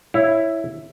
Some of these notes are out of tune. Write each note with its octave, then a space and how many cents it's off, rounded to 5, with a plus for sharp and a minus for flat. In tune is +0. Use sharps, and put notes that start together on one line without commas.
E4 +0 C#5 +0 F5 -15